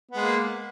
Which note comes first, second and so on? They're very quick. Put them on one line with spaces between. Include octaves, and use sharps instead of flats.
B3 G#3 A#3